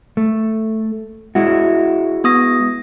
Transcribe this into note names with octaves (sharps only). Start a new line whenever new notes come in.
A3
G#3 E4 F#4
B3 D#6 A#6